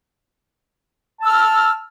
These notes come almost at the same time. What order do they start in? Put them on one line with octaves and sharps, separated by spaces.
A5 E6 F6